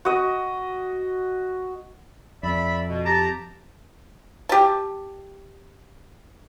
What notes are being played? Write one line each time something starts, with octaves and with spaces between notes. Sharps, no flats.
F#4 D#5
F2 D5 E5 B5
B2
G4 A5 A#5
G4 A5